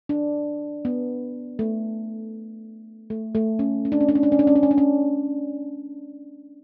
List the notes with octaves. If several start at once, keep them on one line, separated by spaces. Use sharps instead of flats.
D4
B3
A3
A3
A3
C#4
C#4
D4
C#4
D4
C#4
D4
C#4
D4
C#4
D4
C#4
D4
C#4